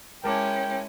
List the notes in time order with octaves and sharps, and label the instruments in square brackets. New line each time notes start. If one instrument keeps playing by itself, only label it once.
[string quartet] G#3 C#4 E4 [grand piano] A#4 A5 D6 [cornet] G5